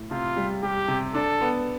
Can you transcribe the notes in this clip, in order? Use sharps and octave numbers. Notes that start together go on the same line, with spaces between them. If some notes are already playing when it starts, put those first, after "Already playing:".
Already playing: A2
C3 F4
G3
G3 G4
C3
D4 A4
B3